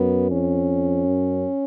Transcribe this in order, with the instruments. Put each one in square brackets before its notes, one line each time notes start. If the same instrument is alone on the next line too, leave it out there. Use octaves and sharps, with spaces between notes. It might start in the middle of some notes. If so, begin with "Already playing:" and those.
Already playing: [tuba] F#2 [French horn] B3
[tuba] F2 [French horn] C#4
[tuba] F#2